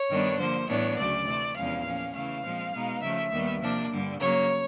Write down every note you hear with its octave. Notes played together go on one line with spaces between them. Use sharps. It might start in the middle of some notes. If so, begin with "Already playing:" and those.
Already playing: C#5
G2 D#3 G3 B3 D4
D3 F3 A#3 C5
A2 E3 G3 B3 D4 C#5
D2 C#3 F#3 A3 D5
C3 E3 A3
E2 C3 F3 G#3 C#4 F5
A#2 F3 A#3 C#4
C#3 E3 A3 F5
A#2 F3 G#3 C4
B2 G#3 B3 D#4
C#3 F3 A3 E5
D#2 D#3 G3 B3
C3 F3 A#3 D4
G2 D3 G3
C#3 F#3 A#3 C#5